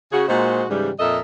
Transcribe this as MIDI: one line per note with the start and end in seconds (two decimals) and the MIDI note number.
0.13 0.26 49
0.13 0.26 66
0.13 0.26 68
0.28 0.64 46
0.28 0.64 56
0.28 0.64 63
0.28 0.64 66
0.28 0.64 72
0.70 0.91 44
0.70 0.91 49
0.70 0.91 52
0.70 0.91 55
1.00 1.19 41
1.00 1.19 46
1.00 1.19 69
1.00 1.19 70
1.00 1.19 75
1.00 1.19 76